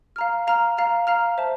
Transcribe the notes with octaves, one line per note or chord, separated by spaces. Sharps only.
F5 A#5 F6
F5 A#5 F6
F5 A#5 F6
F5 A#5 F6
C5 E5 A5